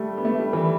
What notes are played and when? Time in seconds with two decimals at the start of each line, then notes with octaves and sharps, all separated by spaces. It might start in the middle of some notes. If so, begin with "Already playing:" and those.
Already playing: G3 A3
0.18 B3
0.25 A3
0.39 G3
0.53 E3